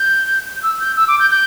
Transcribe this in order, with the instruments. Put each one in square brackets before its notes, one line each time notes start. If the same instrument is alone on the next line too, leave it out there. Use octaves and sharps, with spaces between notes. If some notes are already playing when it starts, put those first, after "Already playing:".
Already playing: [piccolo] G6
G6
E6
G6
E6
D6
G6
G6